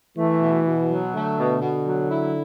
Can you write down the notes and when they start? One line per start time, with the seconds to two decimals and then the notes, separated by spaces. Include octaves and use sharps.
0.17 E3 A3
0.41 B2
0.65 B2
0.90 F#3
1.14 D3 A3
1.38 B2
1.61 B2
1.86 F#3
2.11 E4